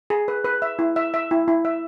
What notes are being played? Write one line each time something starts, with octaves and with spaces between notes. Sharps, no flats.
G#4
B4
B4
E5
E4
E5
E5
E4
E4
E5